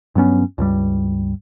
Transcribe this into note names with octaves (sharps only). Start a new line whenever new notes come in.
G2 F#3 B3 C#4
C#2 G2 G3